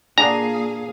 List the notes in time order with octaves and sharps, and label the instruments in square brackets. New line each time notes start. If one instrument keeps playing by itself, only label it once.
[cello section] A#2 G#4 F5 [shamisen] D3 D#3 G#5 [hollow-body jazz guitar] D4 [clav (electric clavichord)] A#5